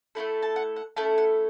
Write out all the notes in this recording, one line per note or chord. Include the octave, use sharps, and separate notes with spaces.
A3 C#4 E4 A4 F#5
A5
F#5
F#5
A3 C#4 E4 A4 A5
F#5